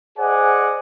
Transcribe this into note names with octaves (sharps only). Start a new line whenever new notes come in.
G#4 C5 D5 D#5 F#5 G#5